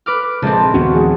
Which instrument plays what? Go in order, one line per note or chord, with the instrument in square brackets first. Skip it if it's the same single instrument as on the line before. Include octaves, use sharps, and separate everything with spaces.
[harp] B4 D6 F6
[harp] A#1 C4 [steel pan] C#3 G#3 [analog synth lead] A5
[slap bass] D#2 B3 C#4 [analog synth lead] F#4
[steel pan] F3 A3 G#4